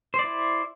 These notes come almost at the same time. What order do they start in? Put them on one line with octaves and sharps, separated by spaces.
C5 D5 E4